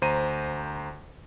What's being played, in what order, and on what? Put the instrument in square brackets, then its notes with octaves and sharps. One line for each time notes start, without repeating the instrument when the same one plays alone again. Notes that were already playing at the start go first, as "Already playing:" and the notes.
[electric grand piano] D2 C5 A#5 D#7